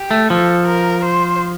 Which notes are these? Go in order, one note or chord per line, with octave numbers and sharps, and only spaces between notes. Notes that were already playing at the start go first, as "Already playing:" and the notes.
Already playing: G4
A3
F3 A4
A#4
C5